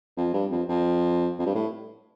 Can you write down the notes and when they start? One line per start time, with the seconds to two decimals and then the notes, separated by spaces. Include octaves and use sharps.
0.17 F2
0.33 G2
0.51 F2
0.69 F2
1.39 F2
1.46 G2
1.55 A2